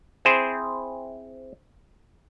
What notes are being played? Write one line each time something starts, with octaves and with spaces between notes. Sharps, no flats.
C4 E4 G#4 C5